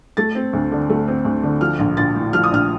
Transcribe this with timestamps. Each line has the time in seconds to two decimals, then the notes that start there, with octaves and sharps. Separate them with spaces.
0.17 A3 A6
0.35 C4
0.53 D2
0.72 D3
0.89 A3
1.08 C4
1.25 D2
1.43 D3
1.61 F3 F6
1.79 A#1
1.97 A#1 A6
2.15 A2
2.33 F3 F6
2.43 D#6
2.51 A#1 F6